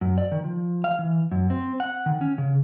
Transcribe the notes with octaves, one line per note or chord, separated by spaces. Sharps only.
F#2
D5
D#3
F3
F5
E3
F#2
C4
F#5
D#3
C#4
C#3